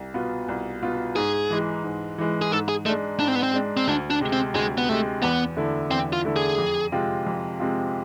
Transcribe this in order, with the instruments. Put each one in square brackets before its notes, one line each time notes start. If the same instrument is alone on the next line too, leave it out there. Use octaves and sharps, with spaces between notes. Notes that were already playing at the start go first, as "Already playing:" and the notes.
Already playing: [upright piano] C2
B2 B3 F4
C2
B2 B3 F4
[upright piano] G#2 [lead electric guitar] G#4
[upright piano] E3 G#3
G#2
E3 G#3
[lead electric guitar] G#4
[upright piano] G#2 [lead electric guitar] A4
[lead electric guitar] G#4
[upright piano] G#3 [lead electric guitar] A3
[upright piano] D4
[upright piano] G#2 [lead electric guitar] D4
[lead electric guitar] C4
B3
C4
[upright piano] G#3 D4
[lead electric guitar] C4
[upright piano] D2 [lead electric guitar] D4
[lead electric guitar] D4
[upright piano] C3 G#3
[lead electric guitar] C4
[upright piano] D2 [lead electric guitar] G#3
[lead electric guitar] B3
[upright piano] C3 G#3 [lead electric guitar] A3
[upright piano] E2 [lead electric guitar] B3
[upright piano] D3 A3 E4
[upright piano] E2 [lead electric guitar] C4
[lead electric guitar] F4
[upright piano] D3 A3 E4
[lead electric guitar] G#4
[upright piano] F2
C3 G#3 C4 F4
F2
C3 G#3 C4 F4